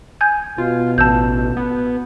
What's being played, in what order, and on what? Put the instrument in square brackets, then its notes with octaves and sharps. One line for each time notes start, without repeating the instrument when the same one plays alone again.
[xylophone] G#5 G6 G#6
[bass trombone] B2 [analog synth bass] F4
[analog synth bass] A1 [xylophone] A5 E6 G6
[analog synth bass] B3